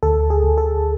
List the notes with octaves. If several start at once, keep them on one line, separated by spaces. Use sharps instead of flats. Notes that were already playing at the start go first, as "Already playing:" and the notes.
D2 A4
G#4
D2
A4